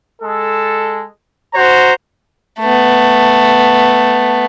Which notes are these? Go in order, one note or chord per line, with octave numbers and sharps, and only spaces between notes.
G#3 A4
F#4 C5 A#5
A3 B3